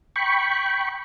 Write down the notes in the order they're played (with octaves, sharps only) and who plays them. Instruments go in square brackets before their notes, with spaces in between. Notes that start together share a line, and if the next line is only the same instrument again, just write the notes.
[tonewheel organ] G5 B5 C#6